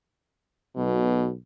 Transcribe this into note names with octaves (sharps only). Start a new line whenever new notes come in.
B1 B2